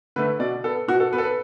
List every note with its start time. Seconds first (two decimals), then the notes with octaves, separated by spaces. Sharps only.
0.16 D3 A3 B4
0.40 B2 D5
0.64 B3 A4
0.88 B2 F#4
1.00 A4
1.13 B3 B4
1.18 A4
1.23 B4